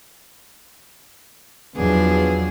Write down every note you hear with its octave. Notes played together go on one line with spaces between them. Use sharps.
E2 F3 F#3 B3 D4 G#4